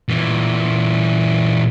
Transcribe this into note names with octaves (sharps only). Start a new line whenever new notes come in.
A#2 E3